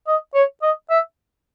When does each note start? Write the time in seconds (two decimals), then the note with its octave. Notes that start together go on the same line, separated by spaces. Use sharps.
0.07 D#5
0.34 C#5
0.62 D#5
0.90 E5